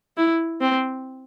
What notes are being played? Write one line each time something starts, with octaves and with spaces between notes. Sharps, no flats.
E4
C4